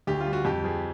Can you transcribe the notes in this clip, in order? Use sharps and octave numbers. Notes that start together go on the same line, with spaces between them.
D2 G4
F4
G3
F#4
F2 G4
F3 G#4